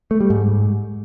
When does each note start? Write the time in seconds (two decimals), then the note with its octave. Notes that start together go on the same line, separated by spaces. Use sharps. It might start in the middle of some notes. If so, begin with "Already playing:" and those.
0.11 A3
0.20 G3
0.30 G#2